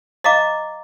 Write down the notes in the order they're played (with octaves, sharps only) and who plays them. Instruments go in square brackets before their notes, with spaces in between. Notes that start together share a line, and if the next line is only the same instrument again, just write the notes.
[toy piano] D#5 F5 A#5 D6